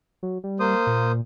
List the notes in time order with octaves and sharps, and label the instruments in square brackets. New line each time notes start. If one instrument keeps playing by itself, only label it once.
[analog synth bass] F#3
G3
[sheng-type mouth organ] A#3 C5 D#6
[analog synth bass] A#2